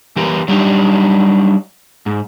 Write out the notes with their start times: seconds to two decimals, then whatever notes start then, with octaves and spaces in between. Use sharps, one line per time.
0.16 E3 G4 A#4 B4
0.48 F#3 G3 D4 D#4 F#4 G4
2.06 G#2